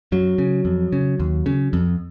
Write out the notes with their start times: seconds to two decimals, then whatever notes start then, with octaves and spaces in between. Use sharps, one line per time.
0.12 F#2 F#3
0.38 C#3
0.65 F2
0.93 C#3
1.20 D#2
1.46 C#3
1.73 F2